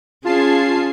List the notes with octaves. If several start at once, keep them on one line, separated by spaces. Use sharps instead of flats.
C#4 F4 G#4 A5 C7